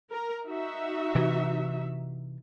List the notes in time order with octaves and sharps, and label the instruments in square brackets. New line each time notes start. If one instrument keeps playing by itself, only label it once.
[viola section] A#4
D#4 F#4 E5
[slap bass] C3 E3